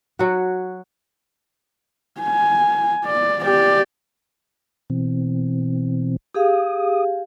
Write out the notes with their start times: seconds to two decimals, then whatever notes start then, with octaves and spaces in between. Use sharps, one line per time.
0.19 F#3 F#4
2.21 G#5
3.05 D5
3.45 G4 D5
4.90 B2 E3 C4
6.34 G4 G#4 F5 D#6